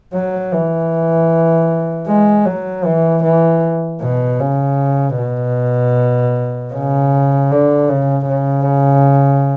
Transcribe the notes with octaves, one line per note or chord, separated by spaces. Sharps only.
F#3
E3
G#3
F#3
E3
E3
B2
C#3
B2
C#3
D3
C#3
C#3